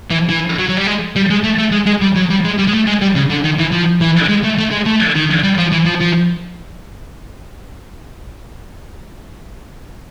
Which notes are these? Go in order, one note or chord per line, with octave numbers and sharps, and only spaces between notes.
E3
E3
F#3
F#3
G3
G#3
G3
G#3
A3
A3
G#3
G#3
G3
F#3
G3
G#3
G3
G#3
A3
G#3
G3
C#3
D3
D#3
E3
F3
E3
G#3
A3
A3
G#3
A3
D#3
G3
F3
E3
F3
F3